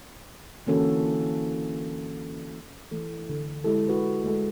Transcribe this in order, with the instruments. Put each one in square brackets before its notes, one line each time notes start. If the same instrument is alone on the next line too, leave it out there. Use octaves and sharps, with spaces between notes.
[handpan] D3 E3 A#3 C#4 F#4 A4
E3 A3 A4
D3
G#3 E4 G4 A4
F#4 B4
G#3 A3 G#4 A4